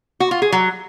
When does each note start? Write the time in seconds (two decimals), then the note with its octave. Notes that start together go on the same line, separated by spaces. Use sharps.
0.20 F#4
0.31 F4
0.42 G#4
0.52 F#3